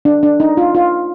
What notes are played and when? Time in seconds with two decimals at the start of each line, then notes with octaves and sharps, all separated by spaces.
0.05 D4
0.23 D4
0.40 D#4
0.57 F4
0.75 F4